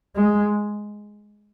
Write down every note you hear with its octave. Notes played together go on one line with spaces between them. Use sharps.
G#3